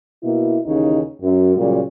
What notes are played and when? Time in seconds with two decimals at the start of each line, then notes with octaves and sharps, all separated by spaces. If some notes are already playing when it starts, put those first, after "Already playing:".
0.23 B2 A#3 E4
0.66 D#2 C#3 E3 D#4
1.21 F#2
1.56 A#2 C#3 F#3 G3